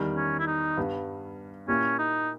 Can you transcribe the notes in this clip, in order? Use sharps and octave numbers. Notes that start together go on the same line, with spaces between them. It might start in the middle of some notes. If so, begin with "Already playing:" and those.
Already playing: E2 D#3 G3
C#4
E4
D#4
G2 G3 B3
A#2 A#3 C#4 E4 G4
D#4